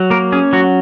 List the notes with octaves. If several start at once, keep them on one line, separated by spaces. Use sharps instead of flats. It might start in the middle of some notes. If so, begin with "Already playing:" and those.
Already playing: F#3
A#3 A#4
C#4 G#4
F#3 F#4